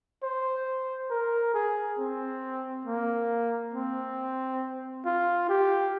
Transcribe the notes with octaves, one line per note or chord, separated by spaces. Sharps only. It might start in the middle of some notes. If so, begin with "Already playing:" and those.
C5
A#4
G#4
C4
A#3
C4
F4
G4